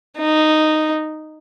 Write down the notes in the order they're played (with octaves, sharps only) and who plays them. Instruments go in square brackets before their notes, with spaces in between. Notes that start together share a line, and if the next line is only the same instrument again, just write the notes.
[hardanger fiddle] D#4